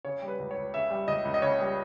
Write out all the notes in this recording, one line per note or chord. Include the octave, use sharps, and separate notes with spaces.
C#3 C#5
G3
B4
C#2
C#5
C#2
C#3 E5
G3
C#2 D#5
C#2
D#5
C#3 C#5
G3